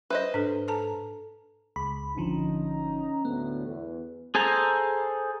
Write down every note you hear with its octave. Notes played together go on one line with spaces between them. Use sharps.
B4 C5 D#5 E5
G#2 D4 A4
A4 A5 A#5
C#2 B5
G#1 D3 F3 C#4 D#4 A#5
D2 A2 B3
E2
G#4 A4 C5 G#5 A#5